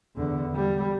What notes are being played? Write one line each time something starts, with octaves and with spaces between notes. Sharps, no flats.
E2 D3
G3